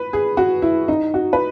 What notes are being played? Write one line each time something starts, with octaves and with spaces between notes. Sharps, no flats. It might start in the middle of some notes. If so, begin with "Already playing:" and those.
Already playing: B4
G#4
F#4
E4
D#4
F#4
B4